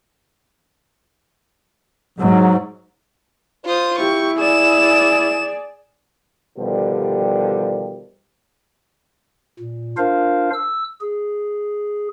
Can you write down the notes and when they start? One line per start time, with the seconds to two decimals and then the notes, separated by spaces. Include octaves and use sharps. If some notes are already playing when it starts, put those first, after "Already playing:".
2.19 G#2 F#3
3.66 F4 C5 D#6
3.98 E4 G4 C#6
4.39 G#4 D5 E7
6.59 B2 D3 D#3 F3 G3
9.60 A#2
9.97 D4 F4 A#4 C5 F5
10.53 E6
11.01 G#4